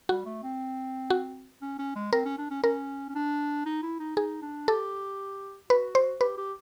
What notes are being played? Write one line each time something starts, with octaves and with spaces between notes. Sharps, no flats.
G3 F#4
A3
C4
F#4
C#4
C#4
G#3
C4 A#4
C#4
D4
C#4
C#4 A#4
C#4
D4
D#4
E4
D#4
D#4 G#4
D4
G4 A4
F#4 B4
C5
G4 B4
G4